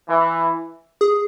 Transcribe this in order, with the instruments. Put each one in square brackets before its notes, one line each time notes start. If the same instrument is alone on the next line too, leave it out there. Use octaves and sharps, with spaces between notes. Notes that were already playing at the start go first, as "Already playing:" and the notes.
[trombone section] E3
[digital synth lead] G#4